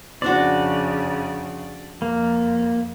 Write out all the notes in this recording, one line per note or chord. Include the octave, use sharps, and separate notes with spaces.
F2 C#3 C4 D4 F#4 D5
F2 A#3